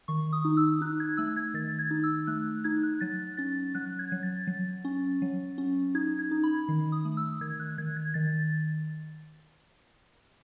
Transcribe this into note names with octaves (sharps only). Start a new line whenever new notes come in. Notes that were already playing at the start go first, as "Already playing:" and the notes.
D#3 C#6
D#6
D#4
E6
D#4 F#6
G#6
A3 E6
G#6
D#3 A6
G#6
D#4
E6
A3 F#6
D#4 G#6
F#6
F#3 A6
C#4 A6
F#3 F#6
G#6
F#3
A6
F#3
C#4
F#3
C#4
D#4 G#6
G#6
D#4
B5
D#3
D#6
A3
E6
D#3 G#6
F#6
D#3 G#6
G#6
D#3 A6